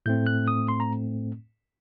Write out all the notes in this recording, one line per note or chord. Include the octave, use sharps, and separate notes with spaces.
A2 A3 C4 G6
F#6
D#6
C6
A#5